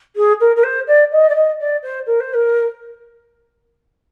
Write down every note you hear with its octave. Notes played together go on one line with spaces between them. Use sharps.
G#4
A#4
A#4
C5
D5
D#5
D5
D#5
D5
C5
A#4
C5
A#4